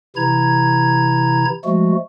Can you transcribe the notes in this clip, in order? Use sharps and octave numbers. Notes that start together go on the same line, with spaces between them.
C3 E3 E4 A#5 G#6
F3 G#3 A3 F#4